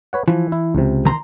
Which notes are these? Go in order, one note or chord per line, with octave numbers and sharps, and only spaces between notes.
B4 C#5 F#5
E3 F3
E4
C#2 C3
D#3 A#5 C6